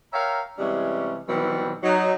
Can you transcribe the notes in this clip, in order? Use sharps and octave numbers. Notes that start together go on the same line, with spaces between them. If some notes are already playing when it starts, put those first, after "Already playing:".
A#4 C#5 E5 F5 G5 A#5
C3 E3 G3 G#3 C#4
B2 D#3 E3 F#3 G3 C4
F#3 D#4